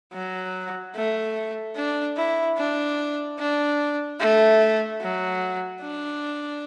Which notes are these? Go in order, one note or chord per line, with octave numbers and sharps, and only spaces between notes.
F#3
A3
D4
E4
D4
D4
A3
F#3
D4